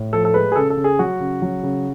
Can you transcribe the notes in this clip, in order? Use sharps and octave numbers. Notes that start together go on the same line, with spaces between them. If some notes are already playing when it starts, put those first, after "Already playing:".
Already playing: A2
F3 A4
A4
G#3 B4
G#4
C#3 A4
A4
C#3
G#4
F#3 F#4
C#3
F#3
C#3